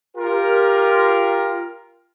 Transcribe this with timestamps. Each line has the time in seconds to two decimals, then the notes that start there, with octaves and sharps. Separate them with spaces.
0.16 F4 G4 A#4